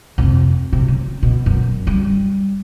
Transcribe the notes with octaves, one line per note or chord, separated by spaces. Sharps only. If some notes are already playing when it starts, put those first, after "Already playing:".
F2 C3
C3
C#3
B2
F#2
G3